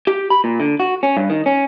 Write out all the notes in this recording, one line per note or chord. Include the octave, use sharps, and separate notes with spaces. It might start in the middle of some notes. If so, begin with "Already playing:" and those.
G4
B5
A#2
D3
F#4
C#4
G2
D#3
C#4